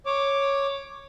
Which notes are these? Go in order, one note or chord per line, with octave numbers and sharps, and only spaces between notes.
C#5 D6